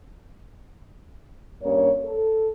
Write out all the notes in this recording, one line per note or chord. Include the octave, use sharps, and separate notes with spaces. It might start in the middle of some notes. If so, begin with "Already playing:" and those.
G2 A#3 C#4 C#5
A4